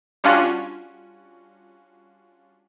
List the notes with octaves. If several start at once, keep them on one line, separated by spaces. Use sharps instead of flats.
G3 C#4 D4 F4 F#4